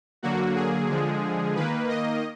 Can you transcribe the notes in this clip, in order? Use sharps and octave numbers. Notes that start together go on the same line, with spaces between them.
D3 F#3 A#3 F#4
G#4
D3 F3 G#3
D#3 A#3 B4
D#5